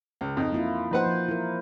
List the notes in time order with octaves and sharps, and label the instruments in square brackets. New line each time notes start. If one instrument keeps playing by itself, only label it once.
[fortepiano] C#2
F2 D#4
[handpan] A#3 E4 F4
[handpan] F3 A#3 C5 [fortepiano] D#4 B4 F#5
[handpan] F3
E4 A#4